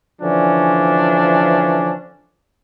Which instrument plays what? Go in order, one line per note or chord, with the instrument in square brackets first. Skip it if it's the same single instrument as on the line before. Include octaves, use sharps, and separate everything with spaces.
[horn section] D3 E3 F3 C#4 D4